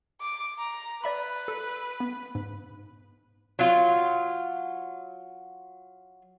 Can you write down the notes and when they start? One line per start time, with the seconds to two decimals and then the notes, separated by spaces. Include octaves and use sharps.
0.21 D6
0.59 A#5
1.04 B4 D5 E5 B5
1.48 A4
2.00 B3
2.35 G#2
3.59 F#3 F4